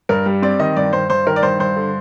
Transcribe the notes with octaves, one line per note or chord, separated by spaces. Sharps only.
G2 A#4
G3
C4 D5
D#3 D#5
G2 D5
G2 C5
G2 C5
D#3 A#4
D5
G2 C5
G2 C5
D3